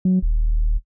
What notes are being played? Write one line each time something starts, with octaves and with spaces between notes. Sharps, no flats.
F#3
D#1